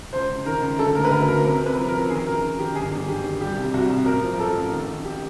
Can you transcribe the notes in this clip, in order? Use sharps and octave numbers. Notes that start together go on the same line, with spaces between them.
C#2 C5
C#2
D#3 A#4
C#2
D3 A4
D2 A#4
B4
D2 A#4
D2 A#4
C3 A#4
C3
B4
F3
A#4
F3
D#3 G#4
F#2 A#4
D#3
D#3 G4
G1 G#4
G1
G1 G4
D#3
G3 G4
C2
C2 F#4
C2
A1 A#4
F3
F3 A4
A1
D#3
D#3
G4